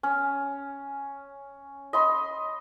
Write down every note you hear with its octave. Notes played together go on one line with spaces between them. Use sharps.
C#4
D#5 B5 C6